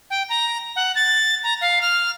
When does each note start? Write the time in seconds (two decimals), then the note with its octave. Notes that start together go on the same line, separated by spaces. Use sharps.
0.10 G5
0.29 A#5
0.76 F#5
0.95 A6
1.44 A#5
1.61 F5
1.82 F6